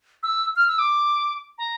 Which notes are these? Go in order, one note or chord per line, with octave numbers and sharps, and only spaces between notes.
E6
F6
E6
D6
A#5